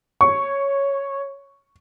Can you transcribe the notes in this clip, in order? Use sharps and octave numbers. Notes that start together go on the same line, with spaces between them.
C#5 C#6